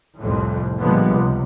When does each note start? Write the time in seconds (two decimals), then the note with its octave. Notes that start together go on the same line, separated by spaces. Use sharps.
0.17 C2 F2 A2
0.77 A#2 D3 F3 G3 G#3 B3
1.06 C#2 C3